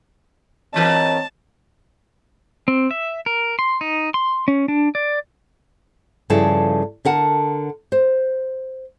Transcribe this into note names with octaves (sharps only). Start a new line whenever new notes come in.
G2 E3 C4 A#4 C#5 D#5 A5
C4
E5
A#4
C6
D#4
C6
C#4
D4
D5
G2 C#3 F3 E4 G#4 A4
D3 A#4 F#5 A5
C5